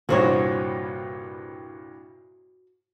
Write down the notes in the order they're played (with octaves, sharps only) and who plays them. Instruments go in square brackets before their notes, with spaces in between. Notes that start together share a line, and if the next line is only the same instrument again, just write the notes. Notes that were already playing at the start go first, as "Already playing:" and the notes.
[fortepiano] C2 G2 A#2 [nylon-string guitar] F#4 C5 C#5